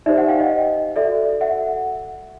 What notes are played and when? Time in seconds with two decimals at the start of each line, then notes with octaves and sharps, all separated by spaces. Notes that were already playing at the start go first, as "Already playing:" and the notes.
0.06 D#4 G4 C5 D5 E5
0.17 E5 F#5
0.29 F5 G5
0.40 D#5
0.51 D#5
0.96 F#4 A4 D5 E5
1.41 E5 F#5